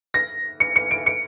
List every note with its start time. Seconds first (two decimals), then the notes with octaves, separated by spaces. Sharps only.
0.14 A#6
0.60 C#7
0.76 C#7
0.91 D7
1.06 C#7